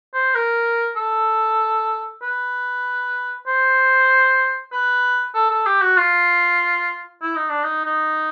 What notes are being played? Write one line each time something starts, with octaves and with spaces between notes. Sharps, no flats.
C5
A#4
A4
B4
C5
B4
A4
A4
G4
F#4
F4
E4
D#4
D4
D#4
D#4